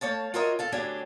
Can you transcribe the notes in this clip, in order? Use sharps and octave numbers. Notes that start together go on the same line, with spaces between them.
A3 C#5 F5 A5
F4 F#4 A#4 C#5 D#5 E5
A4 F5 A5
D2 F#3 C#4 D4 G4 G#4